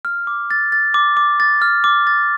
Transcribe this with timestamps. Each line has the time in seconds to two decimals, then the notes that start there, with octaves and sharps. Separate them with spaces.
0.05 F6
0.27 D6
0.51 A6
0.72 A6
0.94 D6
1.17 D6
1.40 A6
1.62 F6
1.84 D6
2.07 A6